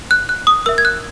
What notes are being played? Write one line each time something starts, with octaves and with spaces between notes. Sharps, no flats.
F#6
F#6
D#6
A#4 E5 E6
G#6
F#6